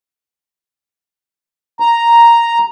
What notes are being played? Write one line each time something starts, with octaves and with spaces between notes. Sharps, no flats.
A#5